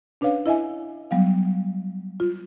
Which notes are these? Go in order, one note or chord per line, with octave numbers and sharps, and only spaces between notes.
C#4 D4 B4 C#5 F5
E4 D#5 E5 G#5
F#3 G3 B3 F5
F4